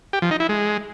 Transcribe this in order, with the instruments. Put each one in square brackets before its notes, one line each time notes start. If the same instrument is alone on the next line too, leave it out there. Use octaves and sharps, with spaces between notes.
[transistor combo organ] G4
F3
D#4
E4
G#3